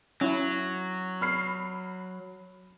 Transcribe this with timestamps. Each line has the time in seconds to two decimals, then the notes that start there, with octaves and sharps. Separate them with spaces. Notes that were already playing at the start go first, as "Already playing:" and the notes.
0.21 F#3 C#4 E4
1.21 B5 F6 C7